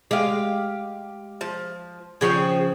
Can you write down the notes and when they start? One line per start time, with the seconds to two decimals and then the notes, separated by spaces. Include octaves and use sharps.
0.11 G#3 G4 F5
1.41 F3
2.21 C#3 F3 G#4 C#5 G5